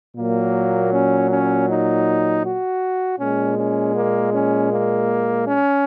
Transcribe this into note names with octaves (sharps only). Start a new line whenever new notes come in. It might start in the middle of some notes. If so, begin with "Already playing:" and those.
A#2 F#3 A#3
C#4
C#4
D#4
F#4
A#2 G#3 C#4
C#4
A#3
C#4
A#3
C#4